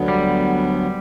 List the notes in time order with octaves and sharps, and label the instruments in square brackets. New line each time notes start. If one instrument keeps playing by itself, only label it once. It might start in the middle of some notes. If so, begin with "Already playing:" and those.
Already playing: [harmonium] D2 D3 F#3 B3
[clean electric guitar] G3